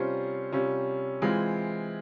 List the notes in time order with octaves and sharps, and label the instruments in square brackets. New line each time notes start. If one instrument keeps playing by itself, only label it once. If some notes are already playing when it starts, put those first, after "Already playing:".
Already playing: [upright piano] C3 G3 C#4 F4 C5
C3 G3 C#4 F4
E3 G#3 C4 F4